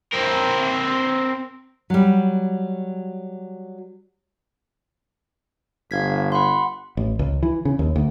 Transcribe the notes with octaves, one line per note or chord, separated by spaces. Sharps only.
C4 A#4
F#3 G3
G1 F5 G#6 B6
F#5 B5 C6
A1
C#2
E3
C#3
D#2
D2